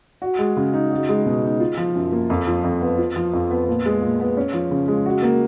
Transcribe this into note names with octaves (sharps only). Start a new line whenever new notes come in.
F#4
G#3
C#3
D#4
F#4
G#3
B2
D#4
F4
F3
F#2
A#3
F2
F3
F2
B3
F4
F3
F2
B3
A#2
G#3
A#2
B3
C#4
F3
C#3
G#3
F#4
A#3